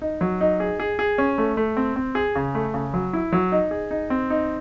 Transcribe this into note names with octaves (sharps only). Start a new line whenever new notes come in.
D#4
F#3
D#4
G#4
G#4
G#4
C#4
A3
A3
C4
C4
G#4
C#3
A3
C#3
F#3
E4
F#3
D#4
G#4
D#4
C4
D#4